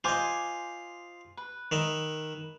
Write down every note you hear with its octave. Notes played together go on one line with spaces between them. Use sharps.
F4 C5 D#5 G#5 D6
B4
D#3 D#5 E5